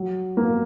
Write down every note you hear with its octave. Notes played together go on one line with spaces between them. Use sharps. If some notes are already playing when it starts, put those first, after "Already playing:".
Already playing: F#3
A#3